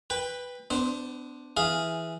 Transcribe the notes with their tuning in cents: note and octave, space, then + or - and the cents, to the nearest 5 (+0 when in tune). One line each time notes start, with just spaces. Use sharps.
B4 +0 G5 +25
B3 +35 D4 +0 C5 +0
E3 +0 G#4 +0 F5 +0